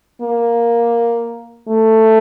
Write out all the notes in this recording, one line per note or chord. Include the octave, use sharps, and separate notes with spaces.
A#3
A3